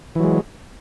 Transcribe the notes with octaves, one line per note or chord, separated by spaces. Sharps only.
E3 F#3 G#3